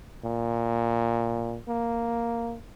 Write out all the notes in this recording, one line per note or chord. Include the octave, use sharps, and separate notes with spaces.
A#2
A#3